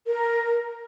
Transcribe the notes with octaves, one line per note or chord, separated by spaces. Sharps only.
A#4